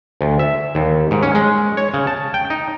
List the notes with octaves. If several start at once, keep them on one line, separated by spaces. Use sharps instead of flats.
D2
E5
D#2
G#2
C#4
G#3
C#5
C#3
A5
G5
D#4